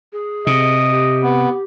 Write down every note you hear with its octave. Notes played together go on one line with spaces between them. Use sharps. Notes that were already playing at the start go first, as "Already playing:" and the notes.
G#4
C3 D#5
G4
B3